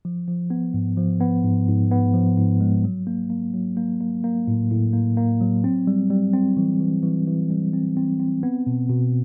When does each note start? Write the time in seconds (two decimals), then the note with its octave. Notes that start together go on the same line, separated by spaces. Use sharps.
0.05 F3
0.28 F3
0.50 B3
0.74 G#2
0.97 F3
1.20 B3
1.44 G#2
1.68 G#2
1.91 B3
2.14 F3
2.38 G#2
2.61 G#3
2.84 F#3
3.07 A#3
3.30 A#3
3.54 F#3
3.77 A#3
4.01 A#3
4.24 A#3
4.47 A2
4.71 A2
4.93 A#3
5.17 A#3
5.41 F#3
5.64 C4
5.87 G3
6.10 G3
6.33 C4
6.57 E3
6.80 E3
7.03 E3
7.27 E3
7.50 G3
7.73 C4
7.97 C4
8.20 C4
8.43 B3
8.67 B2
8.90 B2